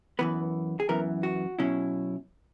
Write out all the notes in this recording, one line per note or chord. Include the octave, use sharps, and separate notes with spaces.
F#2 E3 B3 B4
G#4
F#2 E3 B3 A#4
F#4
B2 F#3 C#4 E4